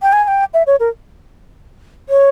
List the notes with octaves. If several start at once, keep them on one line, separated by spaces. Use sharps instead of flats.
G5
G#5
G#5
G5
E5
C#5
A#4
C#5